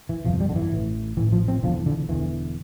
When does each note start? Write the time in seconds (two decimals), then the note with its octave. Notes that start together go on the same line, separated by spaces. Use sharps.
0.09 E3
0.25 G1 F2 C3 F3
0.40 G3
0.49 D3
0.56 E3
0.71 A1 A2
1.17 A1 A2 E3
1.32 F3
1.48 C4
1.63 E1 E2 D3 F3
1.86 D3
2.09 E1 E2 D3 E3